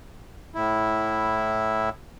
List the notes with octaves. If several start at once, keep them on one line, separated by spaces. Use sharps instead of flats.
A2 E4